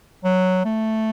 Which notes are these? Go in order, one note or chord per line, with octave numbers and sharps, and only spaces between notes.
F#3
A3